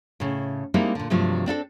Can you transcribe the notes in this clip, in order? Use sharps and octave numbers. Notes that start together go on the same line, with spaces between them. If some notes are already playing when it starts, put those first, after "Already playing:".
A2 C#3
G3 G#3 A#3 C4 D#4 E4
A#2 D3
G2 C3 F3 F#3 A3
C4 D4 E4 A4